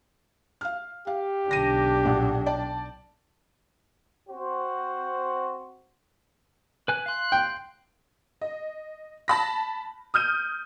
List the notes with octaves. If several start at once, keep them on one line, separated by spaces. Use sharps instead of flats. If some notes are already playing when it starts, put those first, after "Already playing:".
F5 F6
G4 F5
B1 D3 D4 A#6 D#7
A#1 F#5
D5 G5 A5
C4 F#4 C5
B4 G#5 F#6
F5 C6 F#6
G5
D#5
A5 B5 A#6
D#6 F6 G6 D#7